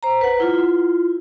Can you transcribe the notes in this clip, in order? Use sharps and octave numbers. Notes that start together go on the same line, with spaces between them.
C5 A#5
B4 F#5
E4 F4